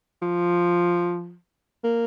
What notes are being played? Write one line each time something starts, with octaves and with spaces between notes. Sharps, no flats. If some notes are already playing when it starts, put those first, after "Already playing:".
F3
A#3